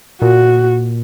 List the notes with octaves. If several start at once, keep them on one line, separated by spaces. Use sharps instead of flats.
A#2 F#4